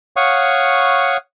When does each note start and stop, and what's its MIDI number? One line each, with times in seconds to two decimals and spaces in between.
0.16 1.17 73
0.16 1.17 77
0.16 1.17 78
0.16 1.17 85
0.16 1.17 87